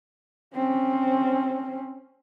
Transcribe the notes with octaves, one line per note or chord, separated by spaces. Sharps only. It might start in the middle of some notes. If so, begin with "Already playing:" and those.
C4 C#4